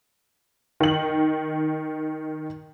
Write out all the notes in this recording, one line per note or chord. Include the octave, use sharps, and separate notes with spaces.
D#3 F#7